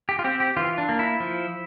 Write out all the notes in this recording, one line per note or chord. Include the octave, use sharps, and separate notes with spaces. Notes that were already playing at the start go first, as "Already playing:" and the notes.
G4
F4
C4 G4
G4
E3 F4
D4
A#3
E4
F3